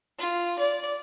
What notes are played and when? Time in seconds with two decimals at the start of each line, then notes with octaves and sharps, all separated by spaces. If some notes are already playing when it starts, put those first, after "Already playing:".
0.18 F4
0.58 D5